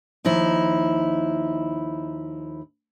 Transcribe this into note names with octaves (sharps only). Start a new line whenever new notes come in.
D#2 F3 D#4 E4